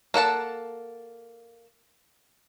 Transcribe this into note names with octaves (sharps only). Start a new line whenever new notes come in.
A#3 A4 F#5 A5